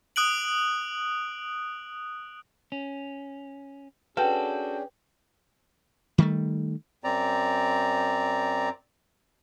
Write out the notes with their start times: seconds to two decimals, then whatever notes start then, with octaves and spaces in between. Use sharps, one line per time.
0.16 D#6 F#6 D7 F#7
2.72 C#4
4.17 C#4 D4 F#4 G#4 A4 B4 G5
6.18 D#3 G3 A3
7.04 F#2 C4 D5 A#5